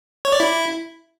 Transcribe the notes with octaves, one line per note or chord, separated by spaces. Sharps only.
C#5
D5
E4